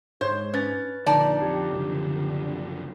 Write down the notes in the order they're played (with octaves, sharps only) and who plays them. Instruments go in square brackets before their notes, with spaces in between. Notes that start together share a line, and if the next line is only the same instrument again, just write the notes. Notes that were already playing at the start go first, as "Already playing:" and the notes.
[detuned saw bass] G#2 [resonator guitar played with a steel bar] C5 [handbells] C#5
[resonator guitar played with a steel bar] C#4 [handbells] B4 A6
[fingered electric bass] A#1 [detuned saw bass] D3 [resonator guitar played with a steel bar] D#4 D5 A5
[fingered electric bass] F2 [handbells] G4
[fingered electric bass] F#1 C2 F3